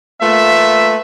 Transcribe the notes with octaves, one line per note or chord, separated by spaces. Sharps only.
A3 A#3 F4 B4 E5